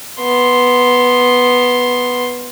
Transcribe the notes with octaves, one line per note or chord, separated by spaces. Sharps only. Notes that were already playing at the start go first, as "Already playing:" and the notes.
B3 C6